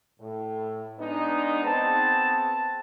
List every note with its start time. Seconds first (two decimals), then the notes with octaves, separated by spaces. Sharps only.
0.20 A2
0.99 G#3 B3 D4 D#4
1.64 B3 C4 G#4 A5